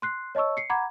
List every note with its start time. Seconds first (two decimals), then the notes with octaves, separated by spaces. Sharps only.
0.02 C6 F#6 C7
0.35 C#5 D#5 A5 C#6 E6
0.57 C7 C#7
0.70 F#5 A#5 B5 D6 G#6